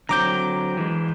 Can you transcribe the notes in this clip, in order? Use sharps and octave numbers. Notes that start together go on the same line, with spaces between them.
D3 F#3 C4 A#5 D6 G6
E3 G#3